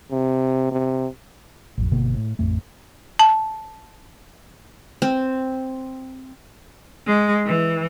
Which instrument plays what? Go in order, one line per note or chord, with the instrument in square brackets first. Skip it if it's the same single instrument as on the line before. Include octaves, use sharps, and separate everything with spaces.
[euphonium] C3
C3
[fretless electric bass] A1 F2
G1 B2 D3 A#3
A2
A1 F2 A3
[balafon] A5
[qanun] C4
[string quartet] G#3
E3